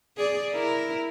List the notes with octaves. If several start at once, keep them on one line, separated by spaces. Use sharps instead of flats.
G#4 D5
E4 A#4